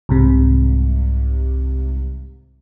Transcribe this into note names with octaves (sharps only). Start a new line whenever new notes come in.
C2 G#2 C3